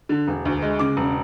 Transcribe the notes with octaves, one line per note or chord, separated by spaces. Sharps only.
D3
E1
D2
G#3
C#3 D6
E1